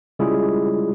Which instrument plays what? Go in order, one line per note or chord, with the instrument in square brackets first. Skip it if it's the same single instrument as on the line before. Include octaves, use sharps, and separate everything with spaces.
[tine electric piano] C#3 G3 G#3 E4 F4 G#4